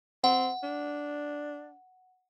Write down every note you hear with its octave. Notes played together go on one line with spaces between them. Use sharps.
C4 F#5
D4